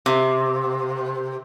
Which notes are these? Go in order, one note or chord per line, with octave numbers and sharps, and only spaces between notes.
C3